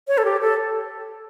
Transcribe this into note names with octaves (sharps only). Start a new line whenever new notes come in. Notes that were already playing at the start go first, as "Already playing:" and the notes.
C#5
A4
G4
A4